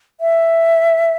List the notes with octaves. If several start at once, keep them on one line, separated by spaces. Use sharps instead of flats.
E5